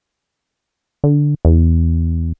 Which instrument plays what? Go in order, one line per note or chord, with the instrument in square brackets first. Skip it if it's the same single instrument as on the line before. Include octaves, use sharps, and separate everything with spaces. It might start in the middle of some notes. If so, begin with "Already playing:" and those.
[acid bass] D3
E2